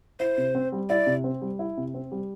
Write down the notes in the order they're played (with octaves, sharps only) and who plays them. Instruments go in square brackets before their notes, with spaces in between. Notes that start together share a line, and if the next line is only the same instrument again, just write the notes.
[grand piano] E4 [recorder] C5
[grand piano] C3
C4
G3
[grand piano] E4 [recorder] D5
[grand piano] C3
C4
G3
E4
C3
C4
G3